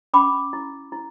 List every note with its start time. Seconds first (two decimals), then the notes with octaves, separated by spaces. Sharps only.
0.14 C#4 B5 D6
0.53 E4
0.92 E4